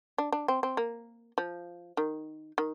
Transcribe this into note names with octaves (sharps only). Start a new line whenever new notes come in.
D4
D4
C4
C4
A#3
F3
D#3
D#3